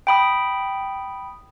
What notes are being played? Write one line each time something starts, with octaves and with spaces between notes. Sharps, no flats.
G5 B5 D#6